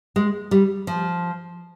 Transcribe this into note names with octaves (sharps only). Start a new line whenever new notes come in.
G#3
G3
F3